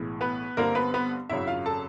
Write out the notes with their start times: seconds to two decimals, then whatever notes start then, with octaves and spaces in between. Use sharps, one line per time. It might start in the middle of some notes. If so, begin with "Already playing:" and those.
Already playing: B1 A2 E3 G#3
0.21 B3 B4
0.57 G2 D3 G3 A#3 C4 A#4
0.75 B3 B4
0.94 B3 B4
1.29 G#1 F#2 C#3 F#3 E4 E5
1.47 F4 F5
1.66 A4 A5